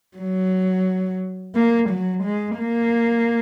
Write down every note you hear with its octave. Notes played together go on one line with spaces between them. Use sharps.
F#3
A#3
F#3
G#3
A#3